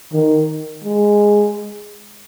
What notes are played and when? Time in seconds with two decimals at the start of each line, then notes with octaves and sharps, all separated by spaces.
0.13 D#3
0.84 G#3